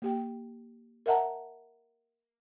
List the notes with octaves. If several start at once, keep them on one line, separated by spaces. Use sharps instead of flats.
A#3 G4 G5
A#4 D#5 E5 F#5 A5 A#5